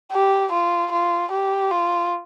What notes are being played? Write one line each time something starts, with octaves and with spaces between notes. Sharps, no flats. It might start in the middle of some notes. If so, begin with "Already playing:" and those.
G4
F4
F4
G4
F4